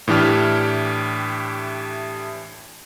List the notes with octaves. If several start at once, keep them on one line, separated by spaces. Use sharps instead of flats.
A2 E3 D4 G4 F6